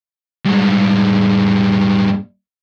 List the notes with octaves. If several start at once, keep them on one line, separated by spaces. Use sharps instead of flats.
G2 G#3